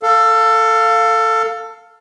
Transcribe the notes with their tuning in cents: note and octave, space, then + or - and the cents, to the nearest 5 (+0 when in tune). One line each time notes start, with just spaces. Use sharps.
A4 +20 F5 +0